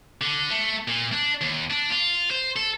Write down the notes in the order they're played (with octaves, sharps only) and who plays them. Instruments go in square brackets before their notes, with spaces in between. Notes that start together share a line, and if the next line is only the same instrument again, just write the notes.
[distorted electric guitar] D3
A3
A#2
D4
D#2
D4
F4
C5
A4